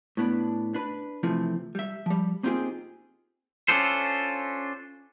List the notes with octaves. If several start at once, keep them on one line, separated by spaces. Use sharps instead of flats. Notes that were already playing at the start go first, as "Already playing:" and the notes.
A2 B3 D4
D4 B4
C3 E3 F3 A3 C4
G3 E5
F3 G3
A#3 C4 D#4 F4 G4 G#4
C#4 D4 F4 A4 C5